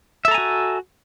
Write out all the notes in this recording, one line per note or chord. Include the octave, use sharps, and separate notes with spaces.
F#4 A4 E5 G#5 A#5